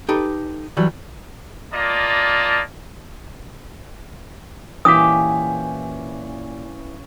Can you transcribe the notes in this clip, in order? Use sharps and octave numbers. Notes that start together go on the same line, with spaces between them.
D#4 G4 A4 B4
E3 F#3 G3
A#3 F4 D5 D#5 A5
A#2 E3 C#4 G4 F5 D#6 B6